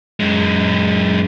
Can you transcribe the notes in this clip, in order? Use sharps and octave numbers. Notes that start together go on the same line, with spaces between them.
F#2 G#3